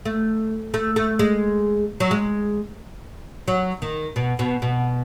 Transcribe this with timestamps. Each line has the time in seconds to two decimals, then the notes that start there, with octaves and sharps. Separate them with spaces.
0.05 A3
0.74 A3
0.96 A3
1.19 G#3
2.00 F#3
2.11 G#3
3.48 F#3
3.82 D#3
4.16 B2
4.39 B2
4.62 B2